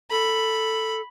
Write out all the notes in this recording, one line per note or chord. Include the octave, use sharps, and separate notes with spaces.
A4 B5